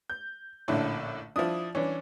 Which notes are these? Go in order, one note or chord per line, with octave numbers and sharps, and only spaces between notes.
G6
A#1 A2 D3 C#4 D4 E4
F3 D4 E4 D#6
E3 C#4 D4